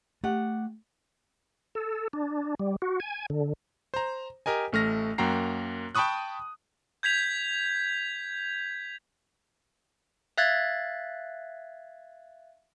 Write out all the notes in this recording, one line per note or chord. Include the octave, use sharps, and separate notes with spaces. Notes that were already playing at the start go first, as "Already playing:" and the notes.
A3 G4 F#5
A4
D4
G3
F#4
G#5
D3
C5 A#5
G4 A#4 D#5 G#5
A1 A3 F6 A#6
F#2 A#3 F#4 G5 A#5 C7
G5 A5 B5 C#6 D#6 F#6
G6 G#6 B6 F7
E5 F5 F#6 G#6 A6